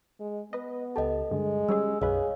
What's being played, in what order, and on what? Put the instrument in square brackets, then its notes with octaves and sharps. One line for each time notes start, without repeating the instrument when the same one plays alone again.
[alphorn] G#3
[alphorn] B3 [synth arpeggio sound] B4 D#5
[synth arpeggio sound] C#2 G4 A5 [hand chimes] A4 D#5
[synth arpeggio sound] G2 D3 [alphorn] G#3
[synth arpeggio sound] G3 C#4 G#4 [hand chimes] E6
[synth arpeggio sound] B1 F#2 B4 [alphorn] G#4 [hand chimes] C#5 D#5 F5